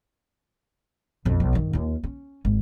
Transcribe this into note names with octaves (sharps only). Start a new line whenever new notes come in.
B1 F2
B1
G2 D#3
D#2 F4
C#4
G#1